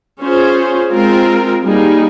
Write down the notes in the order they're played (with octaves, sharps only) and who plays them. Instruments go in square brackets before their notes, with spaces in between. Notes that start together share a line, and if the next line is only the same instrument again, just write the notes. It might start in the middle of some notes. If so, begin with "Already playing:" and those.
[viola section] C#4 F4 G#4 C5
G#3 C4 F4 A#4
G3 A#3 D#4 G#4